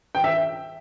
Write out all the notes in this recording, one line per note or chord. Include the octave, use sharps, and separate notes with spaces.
G5
E5